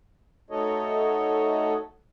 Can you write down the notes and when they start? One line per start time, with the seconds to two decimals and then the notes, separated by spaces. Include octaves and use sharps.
0.50 A3 D#4 F#4 A4 C#5 D#5